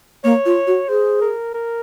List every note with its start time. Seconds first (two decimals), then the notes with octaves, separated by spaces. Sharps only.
0.24 A#3 C#5
0.46 F4
0.67 F#4
0.89 G#4 C5
1.21 A#4
1.54 A#4